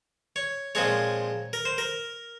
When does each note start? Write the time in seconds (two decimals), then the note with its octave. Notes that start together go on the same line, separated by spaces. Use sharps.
0.36 C#5
0.75 A#2 F3 G#3 C4 C#5
1.53 A#4
1.65 C5
1.78 A#4